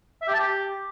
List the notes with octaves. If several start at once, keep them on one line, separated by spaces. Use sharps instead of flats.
E5
G4
A5
G4